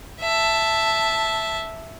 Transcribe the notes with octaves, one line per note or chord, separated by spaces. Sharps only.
E5 A5